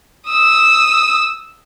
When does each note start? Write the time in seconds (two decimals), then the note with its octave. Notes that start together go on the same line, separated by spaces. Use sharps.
0.28 D#6 E6